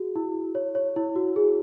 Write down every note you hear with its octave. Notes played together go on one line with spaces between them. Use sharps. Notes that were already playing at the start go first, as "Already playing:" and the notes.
Already playing: F#4 G#4
E4
C#5
C#5
E4
F#4
G#4